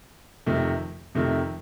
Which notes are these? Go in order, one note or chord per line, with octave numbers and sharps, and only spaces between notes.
F2 C3 D#3 A3
F2 C3 D#3 A3